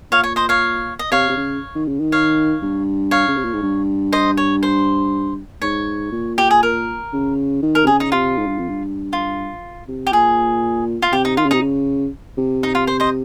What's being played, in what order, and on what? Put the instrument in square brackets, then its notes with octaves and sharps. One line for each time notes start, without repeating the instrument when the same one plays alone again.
[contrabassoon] A#2 [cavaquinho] C#5 F5
[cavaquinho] C#5
C5 D#5
C#5 F5
D#5
[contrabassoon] C3 [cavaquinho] C#5 F5
[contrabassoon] C3
C#3
D#3
C#3
D#3
[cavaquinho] C#5 F5
[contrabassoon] G2
[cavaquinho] C#5 F5
[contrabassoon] C#3
C3
A#2
G#2
G2
[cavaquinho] C5 D#5
C#5
C5
[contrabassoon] G#2 [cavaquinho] C#5
[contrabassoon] A#2
[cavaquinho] G4
G#4
A#4
[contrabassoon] C#3
D#3
[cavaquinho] A#4
[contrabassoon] C3
[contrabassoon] C#3 [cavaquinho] G#4
[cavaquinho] D#4
[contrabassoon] C3 [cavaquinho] F4
[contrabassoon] G#2
G2
F2
G2
[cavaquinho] F4
[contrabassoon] C3
[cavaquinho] G4
[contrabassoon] A#2 [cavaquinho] G#4
[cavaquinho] F4
[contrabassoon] C3 [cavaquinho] G4
[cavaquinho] D#4
[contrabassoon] D#3 [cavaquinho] F4
[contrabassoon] C#3
[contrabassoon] C3 [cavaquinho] D#4
[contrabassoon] C#3
C3
[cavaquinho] D#4
F4
C5
C5 D#5